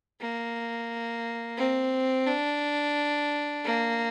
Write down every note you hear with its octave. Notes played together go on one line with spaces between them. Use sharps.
A#3
C4
D4
A#3